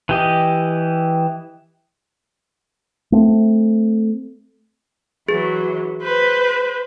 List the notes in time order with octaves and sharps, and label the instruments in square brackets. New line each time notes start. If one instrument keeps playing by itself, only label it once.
[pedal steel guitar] E3 G4 D#5
[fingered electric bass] A3 C4
[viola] E3 F#3 [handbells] G#4
[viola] B4 C5